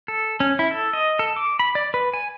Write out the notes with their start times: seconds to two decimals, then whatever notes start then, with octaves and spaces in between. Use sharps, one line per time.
0.08 A4
0.40 C#4
0.59 E4
0.71 A4
0.93 D#5
1.19 A4
1.36 D6
1.59 B5
1.75 D5
1.94 B4
2.14 G#5